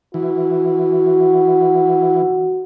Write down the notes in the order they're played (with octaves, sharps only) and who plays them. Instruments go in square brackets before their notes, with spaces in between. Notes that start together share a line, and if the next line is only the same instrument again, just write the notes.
[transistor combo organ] E3 [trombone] F#4